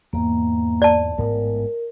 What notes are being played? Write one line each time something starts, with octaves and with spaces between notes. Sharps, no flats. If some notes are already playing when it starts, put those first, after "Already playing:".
E2 G#2 A#3 A#5
D5 A5
A1 G#2 B3 A#4